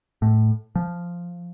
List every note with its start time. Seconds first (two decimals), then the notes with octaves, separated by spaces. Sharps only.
0.22 A2
0.75 F3